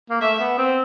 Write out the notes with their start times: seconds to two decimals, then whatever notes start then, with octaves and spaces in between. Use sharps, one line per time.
0.10 A#3
0.21 A3 E5
0.39 B3
0.58 C4